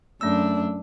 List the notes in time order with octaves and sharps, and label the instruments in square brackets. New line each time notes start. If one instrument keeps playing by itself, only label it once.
[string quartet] F#2 D4 [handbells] A3 E6